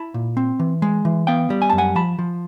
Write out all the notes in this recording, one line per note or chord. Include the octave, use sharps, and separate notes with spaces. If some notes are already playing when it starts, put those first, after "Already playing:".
Already playing: E4 A5 B5
A#2
C4
E3
G#3
E3
B3 F5 G5
G3
G#5
F#2 A5
F#5 G#5
F3 A5 B5
F3